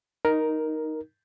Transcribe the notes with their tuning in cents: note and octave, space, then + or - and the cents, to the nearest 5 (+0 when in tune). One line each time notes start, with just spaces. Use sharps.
D#4 +0 A#4 +5